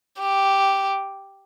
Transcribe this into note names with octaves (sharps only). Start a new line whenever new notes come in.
G4